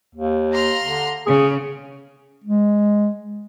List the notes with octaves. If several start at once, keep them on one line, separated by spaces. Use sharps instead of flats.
D#2
A#5 C6 F6
D3
C#3 G#4
G#3